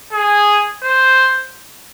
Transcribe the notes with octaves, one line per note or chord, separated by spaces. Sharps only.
G#4
C5